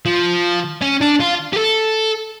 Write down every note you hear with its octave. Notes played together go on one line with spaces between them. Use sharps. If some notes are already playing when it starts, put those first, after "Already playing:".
F3
C#4
D4
F4
G4
A4